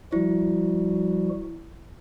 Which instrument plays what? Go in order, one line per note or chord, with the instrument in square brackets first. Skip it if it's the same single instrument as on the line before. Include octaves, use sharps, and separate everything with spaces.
[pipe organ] F3 G3 F#4 [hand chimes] E4